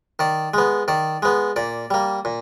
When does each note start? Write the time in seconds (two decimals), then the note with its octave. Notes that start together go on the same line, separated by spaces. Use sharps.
0.19 D#3 D5
0.54 G#3 B3
0.88 D#3 D5
1.22 G#3 B3
1.56 A#2 D5
1.91 G3 A#3
2.25 A#2